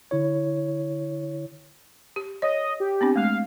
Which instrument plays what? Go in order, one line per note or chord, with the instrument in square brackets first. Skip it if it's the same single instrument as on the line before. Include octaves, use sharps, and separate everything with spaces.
[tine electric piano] D3 E4 C#5
[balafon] G4
[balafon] C#5 [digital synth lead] D#5
[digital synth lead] G4
[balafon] B3 C4 D4
[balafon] G#3 A3 [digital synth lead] F5